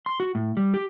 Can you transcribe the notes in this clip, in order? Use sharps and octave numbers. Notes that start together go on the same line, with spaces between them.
C6
F#4
A2
G3
G4